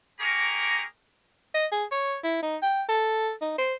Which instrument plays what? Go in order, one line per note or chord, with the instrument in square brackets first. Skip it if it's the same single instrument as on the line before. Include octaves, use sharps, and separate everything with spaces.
[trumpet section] A#3 G4 G#4 A#4 A#5 C#6
[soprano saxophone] D#5
G#4
C#5
E4
D#4
G5
A4
D#4
C5